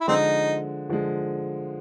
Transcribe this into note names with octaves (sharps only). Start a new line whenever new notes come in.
E4
D3 F3 G#3 C4 D#4
D3 F3 G#3